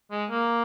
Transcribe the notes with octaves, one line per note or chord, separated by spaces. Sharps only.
G#3
A#3